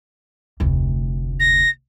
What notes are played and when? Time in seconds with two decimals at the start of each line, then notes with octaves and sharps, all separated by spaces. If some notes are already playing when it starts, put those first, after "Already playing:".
0.60 F1 D2
1.40 A#6